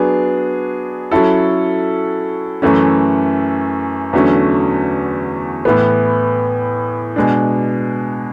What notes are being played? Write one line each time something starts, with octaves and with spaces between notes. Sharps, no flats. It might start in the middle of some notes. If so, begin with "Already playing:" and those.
Already playing: F#3 B3 D4 G#4
F#3 C#4 E4 A4
F#2 E3 A3 C#4
E2 D3 F#3 A3 C#4
A2 E3 B3
B2 G#3 D4